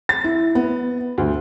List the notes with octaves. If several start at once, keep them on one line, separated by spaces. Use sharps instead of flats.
A6
E4
B3
D2